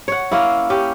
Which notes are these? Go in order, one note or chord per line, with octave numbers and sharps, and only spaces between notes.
C#5 F#5
A#3 C#4 E4
C#4 G4